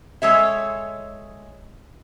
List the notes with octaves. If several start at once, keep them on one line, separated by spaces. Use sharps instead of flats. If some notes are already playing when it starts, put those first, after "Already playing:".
G#3 A4 C#5 E5